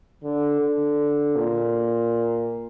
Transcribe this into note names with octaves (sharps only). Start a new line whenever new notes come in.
D3
D3
A#2